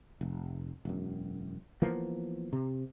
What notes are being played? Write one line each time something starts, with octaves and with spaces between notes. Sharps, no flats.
F1
E1 F#2
E3 F3 A#3 B3
C3